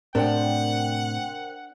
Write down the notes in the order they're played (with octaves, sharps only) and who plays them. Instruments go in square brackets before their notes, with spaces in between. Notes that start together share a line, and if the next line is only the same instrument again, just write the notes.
[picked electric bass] A2 C3 [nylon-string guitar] D4 [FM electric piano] A#4 C5 G5 [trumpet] F#5